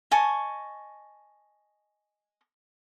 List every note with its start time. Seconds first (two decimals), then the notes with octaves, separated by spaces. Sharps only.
0.11 D#5 G#5 A5 C#6